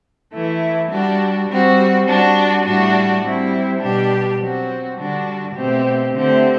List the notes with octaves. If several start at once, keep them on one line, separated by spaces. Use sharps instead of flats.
E3 A3 E4
G3 D4 F#4
G3 C4 F#4
G3 D4 F#4
A2 G3 D4 F#4
G3 C4 E4
B2 G3 D4 G4
F#3 C4 F#4
D3 G3 D4 F#4
B2 A3 C4 G4
D3 A3 C4 G4